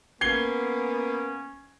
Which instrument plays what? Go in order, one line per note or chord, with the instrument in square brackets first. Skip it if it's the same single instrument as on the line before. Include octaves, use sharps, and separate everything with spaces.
[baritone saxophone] A#3 [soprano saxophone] B3 [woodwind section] C#4 [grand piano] G#6 C7 G7